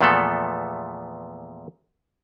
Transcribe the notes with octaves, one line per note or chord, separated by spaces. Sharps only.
E2 A#2 F3 A3 B3 A4